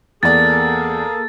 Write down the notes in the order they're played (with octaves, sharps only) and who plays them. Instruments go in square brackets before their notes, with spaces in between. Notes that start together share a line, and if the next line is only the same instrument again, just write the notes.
[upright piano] E2 D5 [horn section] A#3 G#4 A4 [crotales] A6